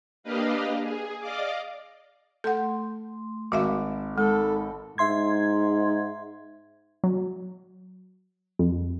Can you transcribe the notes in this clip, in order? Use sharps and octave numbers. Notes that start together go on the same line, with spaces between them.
A#3 D4 G4 B4 D#5 F5
G#4
D5 D#5 F5 D6
A3 A4 F#5 C6
G#1 F#4 E5 F5 D6
G#3 D#4 A4 A5 B5
G#2 E5 C6 G#6
F#3
F2